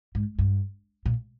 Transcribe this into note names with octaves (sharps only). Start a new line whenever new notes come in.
G#2
G2
A#2